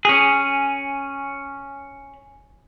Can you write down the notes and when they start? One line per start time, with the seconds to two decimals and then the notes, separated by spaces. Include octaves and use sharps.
0.05 C#4 G#4